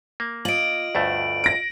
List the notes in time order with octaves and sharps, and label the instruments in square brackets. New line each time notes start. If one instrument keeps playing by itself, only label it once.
[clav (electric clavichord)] A#3
[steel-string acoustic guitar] F4 D#5 [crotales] D7 F#7
[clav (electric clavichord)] D2 G2 A3
[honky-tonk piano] A#6 D7